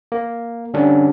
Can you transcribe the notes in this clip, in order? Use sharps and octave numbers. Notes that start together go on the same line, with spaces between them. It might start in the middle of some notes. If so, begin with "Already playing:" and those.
A#3
D3 G3 C#4 D4